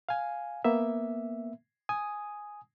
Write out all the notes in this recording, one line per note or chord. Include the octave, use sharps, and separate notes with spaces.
F5 G#5
A#3 B3 E5
G#5 D#6